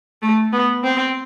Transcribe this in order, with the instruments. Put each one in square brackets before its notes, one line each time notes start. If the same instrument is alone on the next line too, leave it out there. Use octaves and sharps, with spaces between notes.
[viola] A3
B3
C4